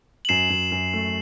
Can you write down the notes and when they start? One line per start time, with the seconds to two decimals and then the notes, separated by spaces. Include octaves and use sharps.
0.25 F#7
0.29 F#2 C7 E7
0.50 F#2
0.71 F#2
0.93 A3